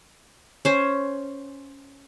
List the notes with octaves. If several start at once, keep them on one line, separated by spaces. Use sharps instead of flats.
C#4 C5